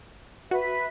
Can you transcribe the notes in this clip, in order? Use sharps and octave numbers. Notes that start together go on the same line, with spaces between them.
F#4 B4 E5